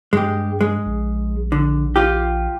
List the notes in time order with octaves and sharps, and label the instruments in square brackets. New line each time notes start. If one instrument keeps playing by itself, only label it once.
[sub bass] G2 [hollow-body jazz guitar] G#3 G4
[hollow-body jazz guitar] G#3
[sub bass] A#1
[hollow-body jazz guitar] D3
F4 G4